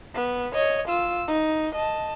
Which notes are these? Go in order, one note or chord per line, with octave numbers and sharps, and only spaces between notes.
B3
C#5 D#5
F4 E6
D#4
D#5 A5